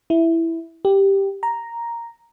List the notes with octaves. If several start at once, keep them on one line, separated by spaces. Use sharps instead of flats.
E4
G4
A#5